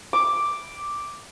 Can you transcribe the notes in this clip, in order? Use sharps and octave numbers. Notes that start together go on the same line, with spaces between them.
D6